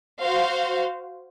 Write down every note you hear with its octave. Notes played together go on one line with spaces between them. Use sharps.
F#4 C5 F5